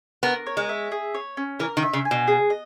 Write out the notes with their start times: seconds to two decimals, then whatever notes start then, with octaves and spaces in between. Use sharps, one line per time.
0.23 B3 A#4
0.46 C#5
0.57 G#3
0.69 E5
0.92 G#4
1.15 C#5
1.37 C#4
1.59 E3 A#4
1.77 D#3
1.83 E5
1.93 C#3
2.05 G#5
2.11 B2
2.28 G#4
2.50 D#5